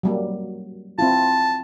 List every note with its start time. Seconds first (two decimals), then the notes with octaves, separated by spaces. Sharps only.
0.03 F#3 G3 A#3
0.99 C4 E4 F4 A5